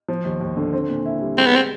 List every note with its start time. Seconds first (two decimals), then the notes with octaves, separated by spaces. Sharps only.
0.08 F3
0.25 D#2
0.41 D#2
0.57 D3
0.73 C4
0.89 A#2
1.05 E4
1.21 G3
1.37 G#3 C4
1.47 B3
1.56 C4